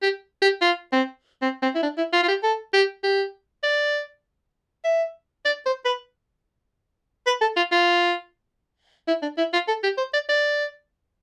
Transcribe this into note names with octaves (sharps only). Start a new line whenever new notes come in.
G4
G4
F4
C4
C4
C4
E4
D4
E4
F4
F4
G4
A4
G4
G4
D5
E5
D5
C5
B4
B4
A4
F4
F4
E4
D4
E4
F4
A4
G4
C5
D5
D5